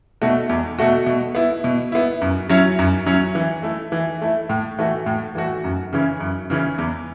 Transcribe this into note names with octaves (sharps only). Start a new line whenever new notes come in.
B2 A3 F#4
E2
B2 A3 F#4
B2
B3 E4
B2
B3 E4
F#2
F#3 C#4 E4
F#2
F#3 C#4 E4
E3
A3 E4
E3
A3 E4
A2
E3 A3 F#4
A2
E3 A3 F#4
F#2
C#3 E3 C#4
F#2
C#3 E3 C#4
E2